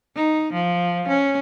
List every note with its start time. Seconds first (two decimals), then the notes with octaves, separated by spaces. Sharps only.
0.16 D#4
0.53 F3
1.08 C#4